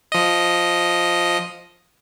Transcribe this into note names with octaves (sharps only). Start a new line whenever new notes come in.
F3 D#5